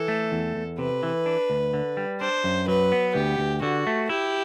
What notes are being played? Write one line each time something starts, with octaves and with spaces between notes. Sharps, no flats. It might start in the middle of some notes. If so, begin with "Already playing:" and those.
Already playing: E3 A4
A3
E2
E2
C3 B4
E3
D4
D2
D3
G3
D4 C5
F#2
F#3 B4
B3
D2 G4
D2
D3 F#4
A3
E4 G4